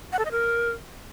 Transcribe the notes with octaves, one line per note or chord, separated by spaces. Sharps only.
F#5
A4
D#5
A#4